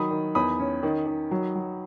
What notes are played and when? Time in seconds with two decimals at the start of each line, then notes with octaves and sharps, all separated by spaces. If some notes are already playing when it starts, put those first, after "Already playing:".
Already playing: D#3 F#3 B5 D#6
0.11 D#3
0.35 E2 B5 D#6
0.60 C#4
0.83 D#3
1.07 D#3
1.31 F#3
1.55 F#3